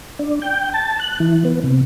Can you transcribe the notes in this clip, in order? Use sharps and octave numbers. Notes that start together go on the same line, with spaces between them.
D4
G5
A5
F#6
E3
B3
C3